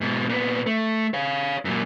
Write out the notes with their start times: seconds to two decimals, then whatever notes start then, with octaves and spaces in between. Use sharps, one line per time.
0.01 G#2 B2
0.29 A#2 B3
0.67 A3
1.14 C#5 F5
1.65 F#2 A#2